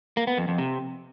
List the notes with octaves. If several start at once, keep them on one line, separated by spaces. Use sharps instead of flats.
A#3
B3
F2
F2
C3